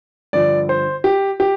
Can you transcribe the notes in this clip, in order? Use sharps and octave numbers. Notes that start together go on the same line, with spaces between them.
G2 D3 F3 D5
C5
G4
G4